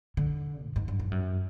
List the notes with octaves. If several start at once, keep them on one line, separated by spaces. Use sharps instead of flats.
D3
G#2
G#2
G2
G2
F#2